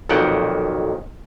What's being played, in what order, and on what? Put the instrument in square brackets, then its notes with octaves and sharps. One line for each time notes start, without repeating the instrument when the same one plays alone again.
[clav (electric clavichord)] B1 F2 A#2 D#3 F#5 G5